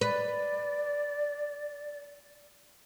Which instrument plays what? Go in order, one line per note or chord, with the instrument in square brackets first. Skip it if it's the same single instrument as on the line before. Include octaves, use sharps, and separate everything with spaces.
[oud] B4 [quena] D5